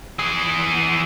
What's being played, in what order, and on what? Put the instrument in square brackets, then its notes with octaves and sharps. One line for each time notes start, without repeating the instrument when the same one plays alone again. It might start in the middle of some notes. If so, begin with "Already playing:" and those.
[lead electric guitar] E3 G#4